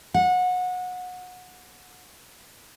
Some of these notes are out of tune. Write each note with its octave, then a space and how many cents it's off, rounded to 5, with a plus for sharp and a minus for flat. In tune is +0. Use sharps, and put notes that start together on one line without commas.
F#5 -25